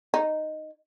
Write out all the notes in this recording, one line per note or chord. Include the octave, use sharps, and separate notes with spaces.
D#4